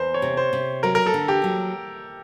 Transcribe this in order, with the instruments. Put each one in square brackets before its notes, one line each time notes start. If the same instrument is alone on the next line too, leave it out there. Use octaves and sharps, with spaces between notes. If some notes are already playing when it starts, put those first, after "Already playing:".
Already playing: [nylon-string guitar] E2 [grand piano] C5
[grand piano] C#5
[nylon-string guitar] C3
[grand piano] C5
[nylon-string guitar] C3
[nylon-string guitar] F#3 [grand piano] A#4
[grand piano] A#4
A4
[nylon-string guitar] D3
[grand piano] G4
[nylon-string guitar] F#3